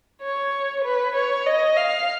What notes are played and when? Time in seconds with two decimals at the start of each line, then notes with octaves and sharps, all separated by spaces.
0.22 C#5
0.85 B4
1.15 C#5
1.46 D#5
1.77 F5